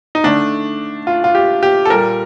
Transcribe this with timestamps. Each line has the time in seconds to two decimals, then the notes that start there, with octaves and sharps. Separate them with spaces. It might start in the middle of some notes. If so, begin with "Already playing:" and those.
0.15 D#4
0.24 D3 A3 D4
1.07 F4
1.24 F4
1.35 G4
1.63 G4
1.85 A4
1.90 A#2 G3 A#3 A#4